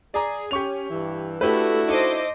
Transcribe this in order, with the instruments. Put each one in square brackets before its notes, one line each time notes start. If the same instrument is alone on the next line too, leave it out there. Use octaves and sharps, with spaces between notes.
[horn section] G#4 [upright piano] D5 A#5
[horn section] C#4 [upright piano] G4 C#6 F7
[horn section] G2 E3
[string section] A3 [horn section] D4 E4 F#4 [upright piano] G4 B4
[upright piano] D#4 A4 [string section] C5 D#5 D6